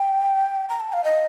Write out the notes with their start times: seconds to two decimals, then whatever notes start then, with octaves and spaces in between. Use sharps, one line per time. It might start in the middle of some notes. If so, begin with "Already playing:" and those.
Already playing: G5
0.69 A#5
0.80 A5
0.93 F5
1.04 D#5